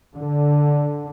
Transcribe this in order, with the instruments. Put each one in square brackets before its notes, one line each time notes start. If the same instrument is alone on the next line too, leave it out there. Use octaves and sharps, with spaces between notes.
[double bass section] D3